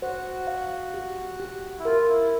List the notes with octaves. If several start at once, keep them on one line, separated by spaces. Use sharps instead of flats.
F#4 C5
F5
G4
G4
E4
F4 A#4
E4